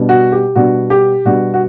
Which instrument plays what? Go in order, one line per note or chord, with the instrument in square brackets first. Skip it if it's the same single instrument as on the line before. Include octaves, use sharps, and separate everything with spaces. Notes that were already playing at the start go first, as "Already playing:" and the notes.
Already playing: [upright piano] B2 G3 B3 D4
F#4
G4
B2 G3 B3 D4 F#4
G4
B2 G3 B3 D4 F#4
F#4